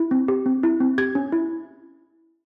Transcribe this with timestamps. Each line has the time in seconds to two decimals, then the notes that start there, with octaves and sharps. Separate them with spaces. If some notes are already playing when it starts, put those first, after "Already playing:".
Already playing: E4
0.11 C4
0.28 G4
0.46 C4
0.63 E4
0.80 C4
0.98 G4 G#6
1.15 C#4
1.32 E4